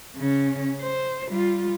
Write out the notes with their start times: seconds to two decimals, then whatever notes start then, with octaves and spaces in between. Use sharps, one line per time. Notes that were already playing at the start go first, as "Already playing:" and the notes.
0.16 C#3 C#4
0.81 C5
1.30 G3 F4